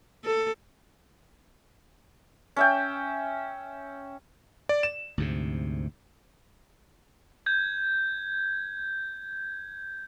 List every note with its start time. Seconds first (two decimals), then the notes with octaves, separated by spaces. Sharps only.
0.25 A4
2.56 C#4 E5 G5
4.69 D5
4.83 E7
5.18 D2 G#2 C3
7.46 G6 G#6